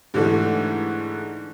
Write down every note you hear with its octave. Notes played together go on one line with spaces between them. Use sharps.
G#2 D3 E3 A3